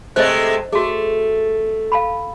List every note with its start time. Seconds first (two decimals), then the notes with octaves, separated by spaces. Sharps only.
0.16 C3 G#3 A3 C5 D#5
0.72 A3 F#4 G#4
1.92 F5 A5 B5